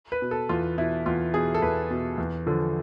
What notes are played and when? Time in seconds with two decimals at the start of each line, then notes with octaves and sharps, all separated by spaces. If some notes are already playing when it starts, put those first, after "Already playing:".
0.12 B4
0.22 B2
0.31 A4
0.49 E2 F4
0.77 B2 E4
1.06 E2 F4
1.34 B2 G#4
1.54 A4
1.62 E2 B4
1.90 B2
2.18 E2
2.46 D3 F3